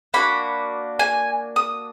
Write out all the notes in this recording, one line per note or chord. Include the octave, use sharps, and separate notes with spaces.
A#3 D4 F#4 B5
G#5
D#6